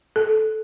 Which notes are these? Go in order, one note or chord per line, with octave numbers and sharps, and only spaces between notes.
A4